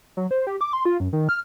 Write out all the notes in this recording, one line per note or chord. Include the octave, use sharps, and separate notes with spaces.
F#3
C5
G4
D6
C6
F4
F#2
D#3
F6